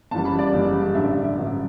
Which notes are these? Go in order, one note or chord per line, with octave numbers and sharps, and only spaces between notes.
F#1 F#2 E3 G3 A5
B5
D5
F#1 F#2 E3 G3
A1 G2 D3 F#3 E5
D5
E5
A1 G2 D3 F#3